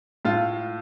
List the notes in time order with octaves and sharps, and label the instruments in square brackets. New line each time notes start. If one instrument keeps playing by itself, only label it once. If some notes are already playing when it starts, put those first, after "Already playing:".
[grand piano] A2 F4